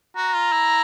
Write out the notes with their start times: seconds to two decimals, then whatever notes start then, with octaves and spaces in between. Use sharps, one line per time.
0.16 F#4 A#5
0.34 F4
0.52 E4